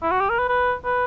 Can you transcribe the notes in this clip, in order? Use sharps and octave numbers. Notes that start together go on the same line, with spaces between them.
E4
F#4
G4
A#4
B4
B4
B4